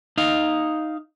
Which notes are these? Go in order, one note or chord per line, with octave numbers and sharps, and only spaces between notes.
D#4 F5